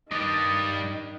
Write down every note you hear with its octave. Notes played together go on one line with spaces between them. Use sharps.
G2 D#3 G3 D4 D5 D#5